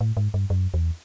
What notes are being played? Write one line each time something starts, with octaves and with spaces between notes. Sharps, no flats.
A2
G#2
G2
F#2
E2